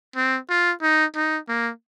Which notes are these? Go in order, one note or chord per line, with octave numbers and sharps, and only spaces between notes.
C4
F4
D#4
D#4
A#3